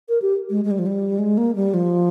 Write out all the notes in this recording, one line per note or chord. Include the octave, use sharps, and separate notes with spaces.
A#4
G4
G#3
G#3
G3
F3
G3
G#3
A#3
G3
F3